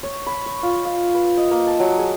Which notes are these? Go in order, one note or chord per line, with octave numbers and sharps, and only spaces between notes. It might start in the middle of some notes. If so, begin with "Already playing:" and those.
C#5
B5
C#6
F4
F5
B4
D#5
A#3
A5
F#3
G#4